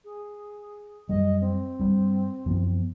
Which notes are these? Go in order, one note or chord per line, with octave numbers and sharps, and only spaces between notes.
G#4
F#2 G3 D#5
C4
G2 G3
F#2 F3 B3